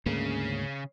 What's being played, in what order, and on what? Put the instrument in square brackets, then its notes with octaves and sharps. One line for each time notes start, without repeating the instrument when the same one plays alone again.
[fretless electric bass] D2 G#2 A#3 [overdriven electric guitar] C#3